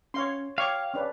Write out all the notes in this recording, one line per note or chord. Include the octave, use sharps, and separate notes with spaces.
C#4 C#5 F5 C6
C#5 F5 G5 C#6 D6
C#4 D4 B4